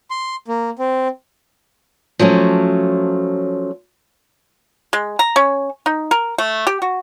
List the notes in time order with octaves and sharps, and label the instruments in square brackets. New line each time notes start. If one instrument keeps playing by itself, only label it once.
[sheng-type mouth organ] C6
A#3
C4
[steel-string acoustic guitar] F3 F#3 A3 C#4
[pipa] G#3
A#5
C#4
D#4
A#4
A3
G4
F#4